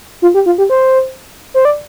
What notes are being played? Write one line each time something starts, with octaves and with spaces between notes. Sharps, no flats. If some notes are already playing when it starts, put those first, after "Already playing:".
F4
G4
F4
G4
C5
C5
D5